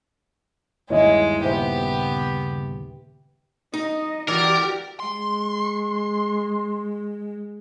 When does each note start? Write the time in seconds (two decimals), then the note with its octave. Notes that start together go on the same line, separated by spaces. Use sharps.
0.90 G1 D#2 G#3 A#3 E4 C#5 D#5 E5
1.44 A#2 C#3 B3 G4 C5 E5
3.74 D#4 D#5
4.28 E3 F#4 G4 A#4 D5
5.00 G#3 C6